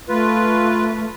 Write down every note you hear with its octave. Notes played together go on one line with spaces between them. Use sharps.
A3 F4 B4